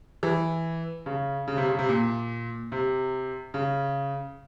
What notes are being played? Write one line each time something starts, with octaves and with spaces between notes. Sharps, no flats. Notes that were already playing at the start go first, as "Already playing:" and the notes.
E3
C#3
C#3
C3
C#3
C3
A#2
C3
C#3